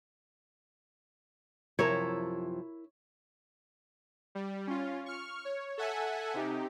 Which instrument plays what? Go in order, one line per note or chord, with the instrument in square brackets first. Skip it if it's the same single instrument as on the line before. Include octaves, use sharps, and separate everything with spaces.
[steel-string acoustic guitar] F#2 C3 F3 [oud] E4 A#4 [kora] C#5
[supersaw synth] G3
C#4 F4
C#6 F6
C#5
A4 E5 F#5 G#5
C3 D#4 G4